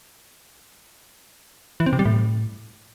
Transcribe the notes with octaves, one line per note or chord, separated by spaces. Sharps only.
E3
C4
C3
G3
A2